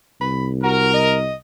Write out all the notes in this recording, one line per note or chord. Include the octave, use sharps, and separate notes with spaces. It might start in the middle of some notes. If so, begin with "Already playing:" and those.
C2 B5
F#4 A#4
D#5